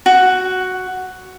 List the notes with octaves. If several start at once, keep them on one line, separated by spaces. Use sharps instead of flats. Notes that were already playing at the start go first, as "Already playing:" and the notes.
F#4